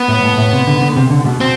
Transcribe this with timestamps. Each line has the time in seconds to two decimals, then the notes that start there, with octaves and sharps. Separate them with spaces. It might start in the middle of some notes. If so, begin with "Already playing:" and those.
Already playing: B3
0.08 A2
0.23 A2
0.38 A2
0.52 C3
0.67 D3
0.81 D3
0.96 C3
1.10 D3
1.25 B2
1.40 C4